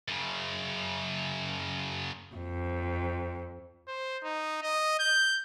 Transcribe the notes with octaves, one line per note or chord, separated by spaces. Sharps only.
F#2 C#3
F2
C5
D#4
D#5
G6